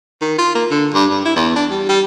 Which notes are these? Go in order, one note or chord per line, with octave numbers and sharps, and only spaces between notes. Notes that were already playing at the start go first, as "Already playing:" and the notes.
D#3
F4
A#3
D3
G2
G2
E4
E2
D4
G3
G3